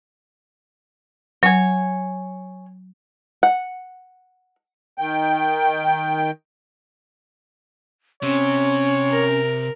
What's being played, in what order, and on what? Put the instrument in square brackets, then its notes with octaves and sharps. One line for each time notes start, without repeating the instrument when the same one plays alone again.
[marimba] F#3 [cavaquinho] C#5 G#5
[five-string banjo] F#5
[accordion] D#3 G5
[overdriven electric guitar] C3 [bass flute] C#4 [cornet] C#5
[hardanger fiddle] A#4